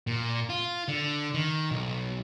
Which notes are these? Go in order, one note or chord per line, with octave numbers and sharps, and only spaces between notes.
A#2
F4
D3
D#3
B1